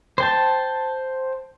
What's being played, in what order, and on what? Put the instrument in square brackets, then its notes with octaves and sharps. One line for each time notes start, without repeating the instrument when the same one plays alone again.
[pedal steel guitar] C5 G5 A5